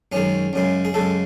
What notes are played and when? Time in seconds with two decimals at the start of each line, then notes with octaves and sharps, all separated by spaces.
0.12 F#2 D#3 G#3 C#4
0.53 F#2 C#3 G#3
0.85 G#4
0.93 F#2 C#3 G#3 A4